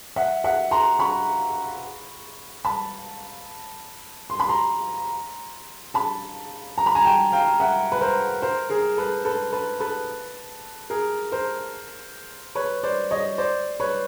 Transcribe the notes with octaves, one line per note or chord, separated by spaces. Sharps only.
E5 F#5
E5 F#5
A#5 C6
B5 C#6
A5 B5
C6
B5
A#5 C6
A5 B5
A#5
B5
G#5 A#5
G5 A5
F5 G5
E5 F#5
B4
A#4 C5
A#4 C5
G#4 A#4
A4 B4
A4 B4
A4 B4
A4 B4
G#4 A#4
A#4 C5
B4 C#5
C5 D5
C#5 D#5
C5 D5
B4 C#5